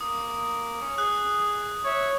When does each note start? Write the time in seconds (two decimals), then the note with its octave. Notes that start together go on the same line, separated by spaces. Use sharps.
0.01 A#3 D#6
0.82 C#4
0.98 G#4 D#6 F#6
1.85 C#5 E5